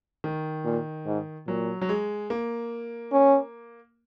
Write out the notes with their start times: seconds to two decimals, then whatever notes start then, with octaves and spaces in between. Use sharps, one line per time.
0.24 D#3
0.65 A#2
1.06 G#2
1.47 A#2 F#3
1.81 F#3
1.89 G#3
2.30 A#3
3.12 C#4